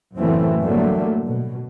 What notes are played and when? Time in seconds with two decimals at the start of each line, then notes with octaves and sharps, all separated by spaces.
0.16 F#1 F#2 A2 E3 A3 C4
0.61 A2 D3 F#3 G3 A3 A#3
1.27 B2